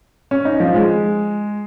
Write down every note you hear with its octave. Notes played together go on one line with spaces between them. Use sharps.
C#4
D#4
F3
G#3